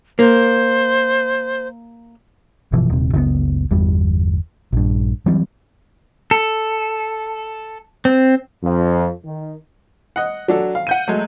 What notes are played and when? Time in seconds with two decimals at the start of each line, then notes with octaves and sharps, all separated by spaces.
0.19 A#3 C5
2.73 G1 B2 E3 F3
2.90 D#1 C3
3.13 F#1 C#2 C3 B3
3.71 G1 E2 G3
4.72 A#1 G2
5.26 E3 F#3 G3 C4
6.31 A4
8.05 C4
8.62 F2
9.25 D#3
10.16 D#5 F#5
10.48 F#3 D4 A4
10.75 F5
10.87 F#5 G6 D#7
11.08 F#3 G#3 A3